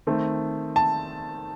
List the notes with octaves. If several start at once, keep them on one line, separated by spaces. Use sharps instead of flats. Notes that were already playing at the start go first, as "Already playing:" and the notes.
D#3 A3 C4
A5